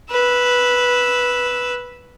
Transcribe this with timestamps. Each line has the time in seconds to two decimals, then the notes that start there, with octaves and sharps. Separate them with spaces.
0.11 B4 E6